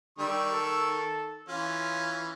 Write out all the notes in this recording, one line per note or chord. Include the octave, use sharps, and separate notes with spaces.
D#3 G3 C#6 E6
A4
E3 C#4 F4